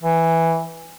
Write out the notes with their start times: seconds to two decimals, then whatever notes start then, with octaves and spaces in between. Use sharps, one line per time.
0.02 E3